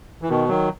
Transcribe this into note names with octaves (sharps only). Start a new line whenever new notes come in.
E3
B2 D#3
D#3 F#3